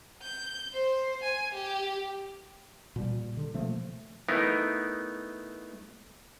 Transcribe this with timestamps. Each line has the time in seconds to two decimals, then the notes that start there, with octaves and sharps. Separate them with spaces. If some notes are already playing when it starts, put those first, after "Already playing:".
0.23 G6
0.73 C5
1.23 G#5
1.54 G4
2.96 A#2 G3
3.37 D3
3.54 B2 F3 A3 A#3
4.29 A3 B3 D#4 E4 A#4